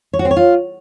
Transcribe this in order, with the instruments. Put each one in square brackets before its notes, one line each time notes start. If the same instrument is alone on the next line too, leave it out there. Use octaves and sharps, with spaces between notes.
[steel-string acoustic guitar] C#5
F#4
C4
C#5
F4